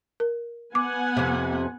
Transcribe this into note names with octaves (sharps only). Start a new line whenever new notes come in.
A#4
B3 F#5 G#5 D6
F2 C3